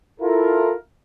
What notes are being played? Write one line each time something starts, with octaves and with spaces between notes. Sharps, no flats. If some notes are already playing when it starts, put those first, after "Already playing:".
E4 F4 A4 A#4